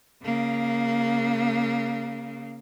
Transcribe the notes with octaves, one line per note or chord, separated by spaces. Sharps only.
C#3 A#3